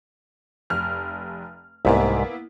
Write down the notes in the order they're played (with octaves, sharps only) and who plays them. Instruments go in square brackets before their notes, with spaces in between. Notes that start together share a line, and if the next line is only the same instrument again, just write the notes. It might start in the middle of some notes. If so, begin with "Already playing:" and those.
[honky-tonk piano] F1 F6
[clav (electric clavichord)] C2 G#2 [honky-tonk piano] A#3 B3 E4